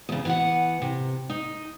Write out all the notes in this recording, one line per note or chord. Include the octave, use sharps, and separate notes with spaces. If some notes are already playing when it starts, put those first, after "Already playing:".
E2 C#3
E3 B3 F#5
C3
D#4